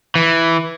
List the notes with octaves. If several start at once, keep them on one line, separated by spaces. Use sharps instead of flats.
E3